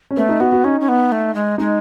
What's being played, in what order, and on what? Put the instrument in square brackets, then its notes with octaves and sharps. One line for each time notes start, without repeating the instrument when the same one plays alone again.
[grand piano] C#4
[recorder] A3 [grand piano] B3
[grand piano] D#4
[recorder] B3 [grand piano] F#4
[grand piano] F#4
[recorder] C#4 [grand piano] D#4
[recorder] C#4
B3
A3
G#3
[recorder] G#3 [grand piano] D#4